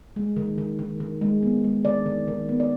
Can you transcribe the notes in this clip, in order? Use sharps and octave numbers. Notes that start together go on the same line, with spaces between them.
G#3
D#3
D#3
D#3
D#3
G#3
B3
G#3
D#3 D5
D#3
D#3
B3
D5